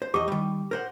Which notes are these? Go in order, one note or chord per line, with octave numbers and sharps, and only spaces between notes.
C5
E2 G4 D#5 D6
D#3 G3
A#4 C5 F#5